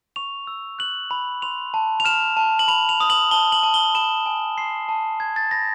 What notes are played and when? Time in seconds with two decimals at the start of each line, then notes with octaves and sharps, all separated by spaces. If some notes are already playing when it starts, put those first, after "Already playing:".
0.16 C#6 F7
0.47 E6
0.79 F#6 F#7
1.11 B5
1.42 C6 F7
1.74 A5
2.00 F7
2.05 F6 E7
2.37 A5
2.59 F#7
2.68 B5 F7
2.89 F7
3.00 D#6
3.10 F#7
3.31 A5 G7
3.52 F#7
3.63 A5
3.74 G7
3.94 B5 E7
4.26 G#5
4.58 C6 C7
4.89 A5
5.20 G#5 G#6
5.36 A6
5.51 B5 A#6